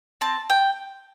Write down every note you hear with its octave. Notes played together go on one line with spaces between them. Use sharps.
C4 A5
G5